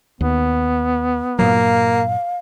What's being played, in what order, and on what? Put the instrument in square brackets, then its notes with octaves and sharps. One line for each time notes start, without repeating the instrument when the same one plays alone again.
[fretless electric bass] D#2 [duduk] B3
[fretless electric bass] G2 A#2 F#3 [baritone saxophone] A#3 [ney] F5